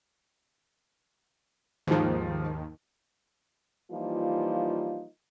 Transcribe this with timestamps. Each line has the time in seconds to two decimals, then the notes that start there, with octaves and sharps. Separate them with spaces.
1.87 D#2 G#2 D#3 F3
3.92 E3 F3 G3 A#3 D#4 F4